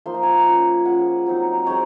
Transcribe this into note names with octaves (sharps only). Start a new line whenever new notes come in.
F3 A#3 D#4 C6
A#5
G#5
A#5
A#3 C#4 F4
F3 G#3 C#4 F#5
F#3 C4 D#4
G#3 C4 D#4 C#5